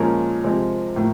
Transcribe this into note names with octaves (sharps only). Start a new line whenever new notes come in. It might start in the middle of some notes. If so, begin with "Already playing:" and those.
Already playing: A#2 F3 G#3 C#4 A#4
C3 F3 G#3 C4
A2 F3 A#3